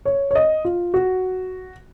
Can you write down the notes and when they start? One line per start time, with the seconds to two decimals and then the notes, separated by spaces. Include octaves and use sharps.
0.05 C#5
0.31 C#5
0.35 D#5
0.65 F4
0.94 F#4